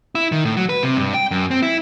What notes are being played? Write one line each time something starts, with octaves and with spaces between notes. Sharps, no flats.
E4
D#3
A2
F#3
B4
C3
G2
G5
F#2
C4
E4